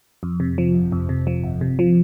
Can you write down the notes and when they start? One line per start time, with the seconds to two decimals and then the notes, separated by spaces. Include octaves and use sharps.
0.23 F2
0.40 C3
0.58 F3
0.74 G1
0.92 F2
1.09 C3
1.27 F3
1.44 G1
1.61 C3
1.79 F3